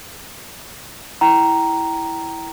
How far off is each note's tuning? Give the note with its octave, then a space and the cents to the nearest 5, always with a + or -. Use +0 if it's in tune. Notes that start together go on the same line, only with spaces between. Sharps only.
E4 +0 G5 -25 A#5 +0